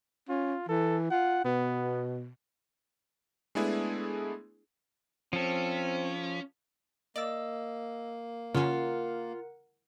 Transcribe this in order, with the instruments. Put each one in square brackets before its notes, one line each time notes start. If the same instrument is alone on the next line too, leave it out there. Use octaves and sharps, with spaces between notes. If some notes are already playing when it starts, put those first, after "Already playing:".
[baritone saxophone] C#4 [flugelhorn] F4
[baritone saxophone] E3 [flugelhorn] A4
[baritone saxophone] F4 [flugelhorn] F#5
[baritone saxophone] B2 [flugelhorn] B3
[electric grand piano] G#3 A3 B3 D4 E4 G#4
[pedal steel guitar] F3 A4 [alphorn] C4 [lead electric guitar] C#4
[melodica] A#3 [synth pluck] D5 [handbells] D#5 E6
[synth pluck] C#3 C#4 [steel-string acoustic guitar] F4 [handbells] A#4 F#5